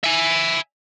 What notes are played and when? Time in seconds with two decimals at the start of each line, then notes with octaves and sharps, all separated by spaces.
0.04 E5 G#5